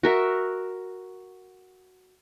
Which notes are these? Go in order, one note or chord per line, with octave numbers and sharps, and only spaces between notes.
F#4 A#4 E5